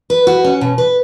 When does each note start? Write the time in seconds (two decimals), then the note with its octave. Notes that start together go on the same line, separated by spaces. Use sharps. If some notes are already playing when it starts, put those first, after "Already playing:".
0.10 B4
0.27 F#4
0.44 C#4
0.61 B2
0.78 B4